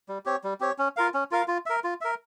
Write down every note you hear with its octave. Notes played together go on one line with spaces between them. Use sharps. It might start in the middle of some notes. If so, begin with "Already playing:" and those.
G3
C4 G4 C#5
G3
C4 G4 C#5
C#4
F4 A#4 F5
C#4
F4 A#4 F5
F4
A#4 E5
F4
A#4 E5